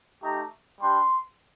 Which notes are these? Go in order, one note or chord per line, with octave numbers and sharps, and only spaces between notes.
A3 D#4 G4 A#5
G3 D4 G4 C6